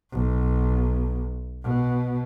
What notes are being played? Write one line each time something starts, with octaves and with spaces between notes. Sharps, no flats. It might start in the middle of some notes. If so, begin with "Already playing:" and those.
B1
B2